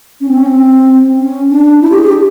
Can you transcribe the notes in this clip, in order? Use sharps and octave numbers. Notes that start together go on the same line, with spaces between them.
C#4
C4
C#4
C4
C#4
D4
E4
G4
G#4
G4